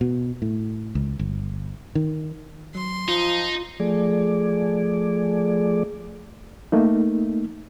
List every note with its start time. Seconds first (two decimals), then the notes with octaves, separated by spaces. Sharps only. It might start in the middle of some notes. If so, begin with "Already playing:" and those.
0.01 B2
0.42 A2
0.95 C#2
1.19 G1
1.95 D#3
2.75 F#3 C6
3.08 F3 D#4 F4
3.80 F3 A3 G#4 D5
6.72 A3 A#3 D#4